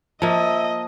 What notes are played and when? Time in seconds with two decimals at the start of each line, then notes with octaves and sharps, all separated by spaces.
0.22 F3 A#3 D#5 E5 A5